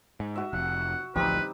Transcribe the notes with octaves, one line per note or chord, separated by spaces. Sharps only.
G#2
F#4 E5
F1 F#5
A1 D2 F3 G3 C4 D#4 B4